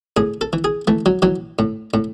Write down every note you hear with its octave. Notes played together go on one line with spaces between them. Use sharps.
A2 G#4
A4
E3
G#4
E3 A3
F#3
E3 F#3
A2
A2